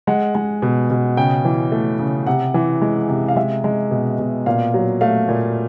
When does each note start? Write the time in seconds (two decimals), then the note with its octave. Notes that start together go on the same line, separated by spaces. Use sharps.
0.07 G#3 F#5
0.35 G#3
0.62 B2
0.90 B2
1.17 C#3 G5
1.45 E3
1.72 A3
1.99 C#3
2.26 C3 F#5
2.54 E3
2.82 G#3
3.09 C3
3.28 F5
3.36 G#3 E5
3.64 G#3
3.91 B2
4.19 B2
4.46 A#2 F5
4.74 F#3
5.01 A3 F5
5.29 A#2